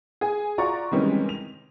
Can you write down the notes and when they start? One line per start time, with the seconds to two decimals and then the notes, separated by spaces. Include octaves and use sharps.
0.21 G#4 G#5
0.58 F4 F#4 D5 A#5 C#6
0.91 C3 D#3 E3 G3 G#3 C#4
1.29 F7